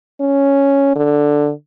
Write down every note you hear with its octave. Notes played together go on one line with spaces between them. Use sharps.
C#4
D3